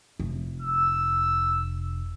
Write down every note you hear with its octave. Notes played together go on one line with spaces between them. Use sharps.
F1
E6